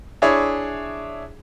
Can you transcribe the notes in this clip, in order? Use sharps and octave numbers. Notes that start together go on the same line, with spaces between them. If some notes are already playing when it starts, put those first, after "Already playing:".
D4 E4 G#4 C#5